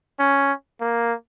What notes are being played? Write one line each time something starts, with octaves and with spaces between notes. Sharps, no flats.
C#4
A#3